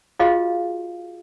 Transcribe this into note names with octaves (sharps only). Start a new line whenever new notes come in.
F4 F#4 G#4 D#5 F5